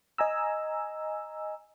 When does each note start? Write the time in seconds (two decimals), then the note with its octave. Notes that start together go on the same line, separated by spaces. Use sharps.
0.18 D#5 G#5 A#5 E6